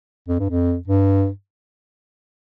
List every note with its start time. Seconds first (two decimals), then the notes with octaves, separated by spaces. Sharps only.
0.28 F2
0.39 G2
0.50 F2
0.87 G2